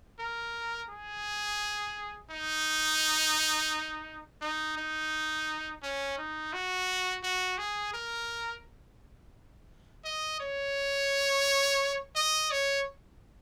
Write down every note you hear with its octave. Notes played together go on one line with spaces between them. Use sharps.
A#4
G#4
D#4
D#4
D#4
C#4
D#4
F#4
F#4
G#4
A#4
D#5
C#5
D#5
C#5